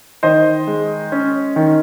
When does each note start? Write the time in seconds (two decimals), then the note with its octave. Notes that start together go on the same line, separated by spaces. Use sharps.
0.23 D#3 C5 D#5
0.67 G#3
1.12 C#4
1.56 D#3